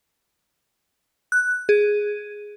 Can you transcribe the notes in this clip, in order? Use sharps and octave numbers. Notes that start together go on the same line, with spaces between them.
F#6
G#4